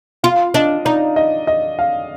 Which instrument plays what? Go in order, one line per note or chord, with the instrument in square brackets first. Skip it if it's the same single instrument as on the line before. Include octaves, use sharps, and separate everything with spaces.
[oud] F4 [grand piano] F5
[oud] D4 [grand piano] D#5
[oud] D#4 [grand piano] D5
[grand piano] D#5
D#5
F5